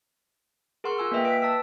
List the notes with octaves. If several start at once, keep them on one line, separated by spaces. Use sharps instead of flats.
G#4 A#4 F#5 C6 C#6 F6
F4 G#5 E6 F6
A#3 B4 D#5 E5 G5
B4 B6 D7
A5 E6